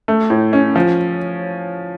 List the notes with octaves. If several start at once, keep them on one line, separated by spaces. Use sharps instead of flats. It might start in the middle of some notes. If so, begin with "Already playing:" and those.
A3
A2
C#4
F3